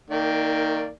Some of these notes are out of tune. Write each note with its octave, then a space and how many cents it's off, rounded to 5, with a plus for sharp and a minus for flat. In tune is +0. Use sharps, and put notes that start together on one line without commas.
D#3 +10 A#3 -25 D5 +0